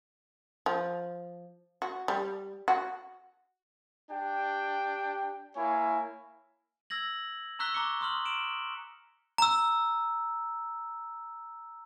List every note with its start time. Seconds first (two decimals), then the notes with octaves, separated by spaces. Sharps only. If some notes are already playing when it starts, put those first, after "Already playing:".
0.66 F3
1.82 F#4
2.08 G3
2.68 F#4
4.11 D4 G4 G5
5.56 A#3 E4 C#5 G#5
6.90 E6 G#6 A#6 F#7
7.59 A#5 C#6 E6 F#6 B6 G7
7.74 A#5 C#6 D6 C#7
8.01 C6 D#6 F6 F#7
8.25 D7 E7 F#7
9.38 A#5 E6